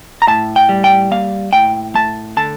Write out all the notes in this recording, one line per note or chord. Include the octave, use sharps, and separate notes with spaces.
A#5
A2 A5
G5
G3
G5
A#3 F5
A2 G5
A3 A5
D3 A5